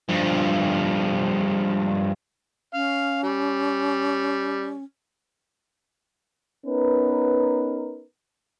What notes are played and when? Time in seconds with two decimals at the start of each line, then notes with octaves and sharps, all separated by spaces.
0.09 G2 F3
2.74 C#4 F5
3.24 G3
6.66 B3 C#4 D#4 A#4 B4